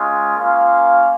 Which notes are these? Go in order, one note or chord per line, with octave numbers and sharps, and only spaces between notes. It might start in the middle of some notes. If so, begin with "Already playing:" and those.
Already playing: G#3 C#4 F4
A#3 C#4 F4 F5